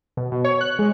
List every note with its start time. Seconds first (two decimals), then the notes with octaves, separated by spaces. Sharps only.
0.17 B2
0.32 B2
0.44 C#5
0.61 F#6
0.79 G#3